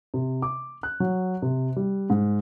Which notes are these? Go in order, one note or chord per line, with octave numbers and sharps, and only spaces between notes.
C3
D6
F#6
F#3
C3
G3
G#2